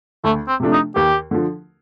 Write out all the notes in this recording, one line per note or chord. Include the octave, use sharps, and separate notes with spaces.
D2 A3
C4
C3 F3 A3 D4
D#4
D#2 G4
D3 F3